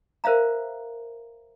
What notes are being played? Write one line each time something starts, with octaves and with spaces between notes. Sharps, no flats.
A#4 C5 E5 F5 A#5